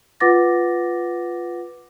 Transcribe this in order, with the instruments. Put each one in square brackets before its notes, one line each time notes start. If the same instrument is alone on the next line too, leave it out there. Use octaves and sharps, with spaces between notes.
[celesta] F4 B4 F#5 D6 A6 A#6